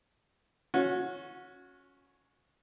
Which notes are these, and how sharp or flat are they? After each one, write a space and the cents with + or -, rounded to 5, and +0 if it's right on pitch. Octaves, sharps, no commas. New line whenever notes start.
C#4 +0 F#4 -25